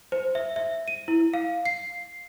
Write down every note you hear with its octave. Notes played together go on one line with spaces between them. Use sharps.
C5
E5
E5
D#7
E4
F5
C7